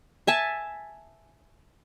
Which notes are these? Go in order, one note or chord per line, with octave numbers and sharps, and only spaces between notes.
E5 G#5 A5